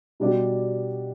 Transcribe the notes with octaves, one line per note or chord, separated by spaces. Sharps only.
B2 G3 D4 G4